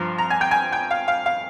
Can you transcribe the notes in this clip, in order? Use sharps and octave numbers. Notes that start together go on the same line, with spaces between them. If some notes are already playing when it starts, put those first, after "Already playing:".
Already playing: G2 F3 A#5
A#5
G#5
G5
G#5
G5
F5
F5
F5